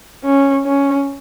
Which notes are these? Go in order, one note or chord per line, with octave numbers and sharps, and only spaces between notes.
C#4
C#4